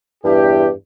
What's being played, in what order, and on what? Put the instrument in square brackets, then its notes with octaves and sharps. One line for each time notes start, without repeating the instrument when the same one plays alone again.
[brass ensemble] E2 E4 G4 [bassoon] G2